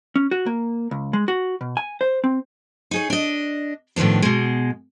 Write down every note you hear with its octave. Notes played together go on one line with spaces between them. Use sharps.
C#4
F#4
A#3
C#2
G#3
F#4
B2
G#5
C5
C4
D#4 G#4 C#5
D4 D#5
A2 D#3 F3 B3 D4
B2 G#3